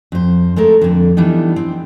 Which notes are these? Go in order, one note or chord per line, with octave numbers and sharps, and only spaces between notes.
F2 C5
G#3 A3 A4 A#4
F2 D3
E3 G3 B3 D4 D#4
C4